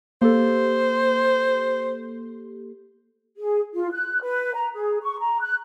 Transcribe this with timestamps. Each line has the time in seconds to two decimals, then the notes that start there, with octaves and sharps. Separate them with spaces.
0.22 A#3 G4 A4 C5
3.37 G#4
3.74 F4
3.93 F#6
4.22 B4
4.55 A#5
4.73 G#4
5.02 C#6
5.20 A#5
5.41 F#6